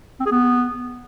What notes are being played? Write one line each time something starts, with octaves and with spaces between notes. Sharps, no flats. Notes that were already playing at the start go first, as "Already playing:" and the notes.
C4
G#4
B3